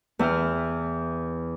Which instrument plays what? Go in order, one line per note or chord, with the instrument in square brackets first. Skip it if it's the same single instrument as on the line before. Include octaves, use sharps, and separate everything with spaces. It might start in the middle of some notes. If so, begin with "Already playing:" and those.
[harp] E2 E4 G5 F6